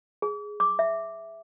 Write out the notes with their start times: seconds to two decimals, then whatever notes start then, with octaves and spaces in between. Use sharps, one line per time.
0.22 G#4
0.60 D6
0.79 E5